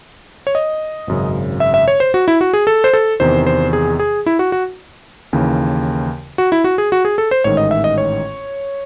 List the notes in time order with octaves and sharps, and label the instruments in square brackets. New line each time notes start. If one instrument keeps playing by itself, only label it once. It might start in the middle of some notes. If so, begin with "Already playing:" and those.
[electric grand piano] C#5
D#5
G#1 F#2 C#3
E5
E5
C#5
C5
F#4
E4
F#4
G#4
A4
C5
A4
E2 C3 D#3 C5
C5
G#4
G#4
E4
F#4
F#4
D#2 C#3 E3
F#4
E4
F#4
G#4
F#4
G#4
A4
C5
A1 G#2 D#3 C#5
D#5
E5
D#5
C#5